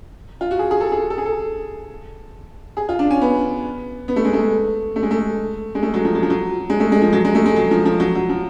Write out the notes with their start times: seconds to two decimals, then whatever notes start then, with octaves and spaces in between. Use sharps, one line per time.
0.41 F4
0.51 F#4
0.59 G#4
0.71 G#4
0.81 A4
0.92 G#4
1.10 A4
1.18 G#4
1.26 A4
2.77 G#4
2.89 F4
2.99 D4
3.11 C#4
3.21 B3
4.08 B3
4.16 A3
4.25 G#3
4.33 A3
4.96 A3
5.03 G#3
5.11 A3
5.75 G#3
5.83 A3
5.94 F#3
6.05 F3
6.15 F#3
6.23 F3
6.30 F#3
6.70 G#3
6.80 A3
6.92 G#3
7.02 F3
7.13 F#3
7.25 G#3
7.35 A3
7.46 G#3
7.56 F#3
7.71 F3
7.85 F3
8.00 F#3
8.15 F#3
8.29 F3